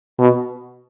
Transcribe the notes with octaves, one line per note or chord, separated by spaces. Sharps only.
B2